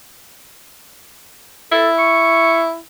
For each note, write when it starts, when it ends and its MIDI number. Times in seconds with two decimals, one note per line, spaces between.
1.72 2.79 64
1.72 1.88 69
1.98 2.62 85